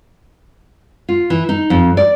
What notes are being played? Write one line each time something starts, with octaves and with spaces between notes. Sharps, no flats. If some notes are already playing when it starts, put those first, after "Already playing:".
F4
E3
D#4
F2
D5